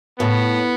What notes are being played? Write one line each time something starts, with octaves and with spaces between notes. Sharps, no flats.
A2 B3